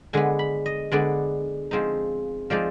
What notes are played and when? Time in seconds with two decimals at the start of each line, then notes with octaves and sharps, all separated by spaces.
0.13 D3 G#3 B3 G#5
0.39 B5
0.66 D#5
0.91 D3 G#3 B3 D5
1.71 F3 G#3 C4 D#4
2.50 F3 G#3 C4 D#4 D5